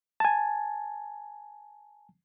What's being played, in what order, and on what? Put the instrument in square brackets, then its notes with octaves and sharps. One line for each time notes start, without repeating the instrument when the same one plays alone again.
[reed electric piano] G#5 A5